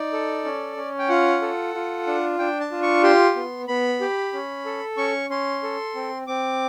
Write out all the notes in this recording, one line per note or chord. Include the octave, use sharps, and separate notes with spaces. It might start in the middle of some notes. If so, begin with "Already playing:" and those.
Already playing: D#4 D5
A4
C#4
C#4
G5
F4 F#5
A4
F4
D4
D4 G5
A5
F4
C#6
G4 C6
B3
B3 B5
G4
C#4
A4
C#4 C#6
C#4 C6
A4
C4
C4 D6